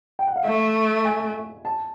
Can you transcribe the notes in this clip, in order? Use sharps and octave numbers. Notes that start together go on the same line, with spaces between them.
G5
F#5
F5
A3 E5
G#5
A5